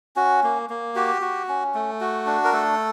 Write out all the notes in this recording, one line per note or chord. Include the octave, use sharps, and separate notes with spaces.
C#4 F#4
A#3
A#3
F#4 G4
F#4
C#4
A3
F#4
D4
A#4
A3 A4